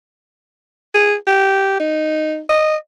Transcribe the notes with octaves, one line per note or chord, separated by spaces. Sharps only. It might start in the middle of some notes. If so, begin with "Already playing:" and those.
G#4
G4
D#4
D#5